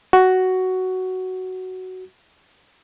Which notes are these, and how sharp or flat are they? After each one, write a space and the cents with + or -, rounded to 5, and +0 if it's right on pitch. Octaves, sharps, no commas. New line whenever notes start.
F#4 +10